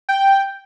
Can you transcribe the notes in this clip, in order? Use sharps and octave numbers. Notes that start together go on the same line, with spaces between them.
G5